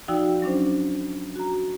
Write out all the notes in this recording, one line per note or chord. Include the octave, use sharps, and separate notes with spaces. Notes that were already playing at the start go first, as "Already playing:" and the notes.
F3 D#4 F#4 D5 G5 E6
F#3 C#4 D4 C5
F#4 A#5